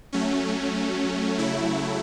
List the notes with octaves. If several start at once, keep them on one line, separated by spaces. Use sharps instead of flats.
F#3 A3 C#4
C#3 F#3 A3 E4